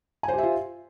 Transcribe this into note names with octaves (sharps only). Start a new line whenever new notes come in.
F4 G4 C5 E5 G#5